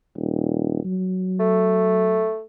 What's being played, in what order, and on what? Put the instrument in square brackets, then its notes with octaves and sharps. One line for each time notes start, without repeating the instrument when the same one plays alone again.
[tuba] D#1
F#3
[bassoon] A3